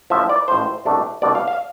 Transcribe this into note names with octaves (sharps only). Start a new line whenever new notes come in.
A1 A2 F3 E5
D5
A1 A2 F3 C5
C2 B2 A3 D4
C2 B2 A3 D4 D5
F5
F5